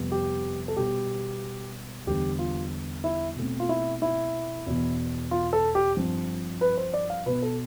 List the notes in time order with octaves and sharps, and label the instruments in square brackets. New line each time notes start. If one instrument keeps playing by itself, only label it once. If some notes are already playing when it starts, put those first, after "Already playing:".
Already playing: [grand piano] F2 C3 G3 B3
G4
A4
B2 G3 B3 G4
E2 D3 G3 B3 G4
F4
E4
B2 A3 C4
F4
E4
E4
E2 B2 B3
F4
A4
G4
G2 F3 C4
B4
C5
D5
F5
B2 B3 B4
A4